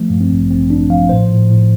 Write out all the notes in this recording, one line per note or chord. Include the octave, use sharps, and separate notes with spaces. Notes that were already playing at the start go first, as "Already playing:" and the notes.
Already playing: F3 A3
G2
C4
A1
A1 C4
A1 D4
F3 F5
A2 C5
A2
A2